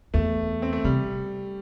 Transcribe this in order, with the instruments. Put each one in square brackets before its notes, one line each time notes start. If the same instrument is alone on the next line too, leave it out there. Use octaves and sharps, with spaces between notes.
[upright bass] E2 [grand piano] A3
[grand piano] C4
A3
[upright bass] C3 [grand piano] G3